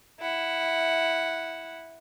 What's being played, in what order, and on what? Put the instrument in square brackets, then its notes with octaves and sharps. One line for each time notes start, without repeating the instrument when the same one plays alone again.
[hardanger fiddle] E4 F#5